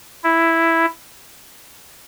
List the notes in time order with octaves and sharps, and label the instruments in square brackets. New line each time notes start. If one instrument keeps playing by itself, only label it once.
[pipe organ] E4